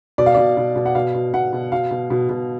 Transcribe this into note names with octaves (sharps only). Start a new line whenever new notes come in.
B2 D5
F5
B2 D5
B2
B2
F#5
B2 F5
B2
B2 F#5
B2
B2 F5
B2
B2
B2